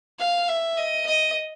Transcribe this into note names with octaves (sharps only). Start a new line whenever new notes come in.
F5
E5
D#5
D#5